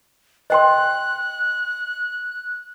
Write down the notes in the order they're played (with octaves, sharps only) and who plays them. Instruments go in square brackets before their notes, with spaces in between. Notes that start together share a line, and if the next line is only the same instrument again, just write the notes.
[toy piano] D#5 G5 C6 [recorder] F#6